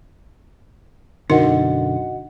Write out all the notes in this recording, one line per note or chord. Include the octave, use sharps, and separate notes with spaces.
F#2 B2 D3 D#4 F#4 A#4 D#5 F#5